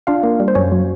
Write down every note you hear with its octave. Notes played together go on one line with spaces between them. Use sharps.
D4 F4 F5
A#3
G3
C5
F#2 C#4 C#5
F#3